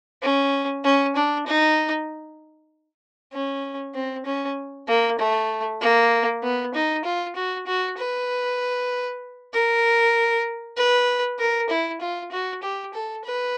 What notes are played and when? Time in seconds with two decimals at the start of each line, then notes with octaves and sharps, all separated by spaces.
0.23 C#4
0.84 C#4
1.16 D4
1.47 D#4
3.33 C#4
3.95 C4
4.26 C#4
4.88 A#3
5.19 A3
5.81 A#3
6.43 B3
6.74 D#4
7.05 F4
7.36 F#4
7.67 F#4
7.98 B4
9.53 A#4
10.77 B4
11.39 A#4
11.69 E4
12.01 F4
12.31 F#4
12.63 G4
12.94 A4
13.25 B4